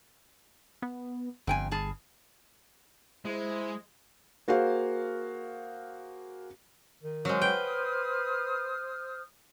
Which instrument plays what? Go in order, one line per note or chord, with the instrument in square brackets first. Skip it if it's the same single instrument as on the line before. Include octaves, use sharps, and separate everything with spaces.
[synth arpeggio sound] B3
[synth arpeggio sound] G1 [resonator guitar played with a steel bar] F2 G5 G#5
[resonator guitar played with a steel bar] G3 G#4 A5
[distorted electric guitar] G#3 [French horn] E4 [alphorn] C5
[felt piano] A#3 F#4 G#4 C5 F5
[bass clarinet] D#3
[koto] F#3 G#3 [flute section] C5 D#6 F6
[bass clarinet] B4 [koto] G5